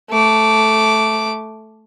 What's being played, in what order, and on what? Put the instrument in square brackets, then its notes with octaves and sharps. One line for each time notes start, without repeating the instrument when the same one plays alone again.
[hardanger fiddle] A3 D6